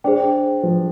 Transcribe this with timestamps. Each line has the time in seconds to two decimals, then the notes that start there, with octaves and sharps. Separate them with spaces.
0.04 D4 G#4 C5 G5
0.63 F3